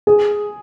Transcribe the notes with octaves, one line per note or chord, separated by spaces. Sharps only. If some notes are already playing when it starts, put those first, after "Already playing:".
G#4